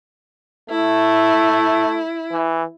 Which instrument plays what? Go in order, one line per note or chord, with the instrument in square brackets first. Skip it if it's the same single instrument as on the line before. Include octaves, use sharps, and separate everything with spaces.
[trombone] A3 [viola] E4
[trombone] E3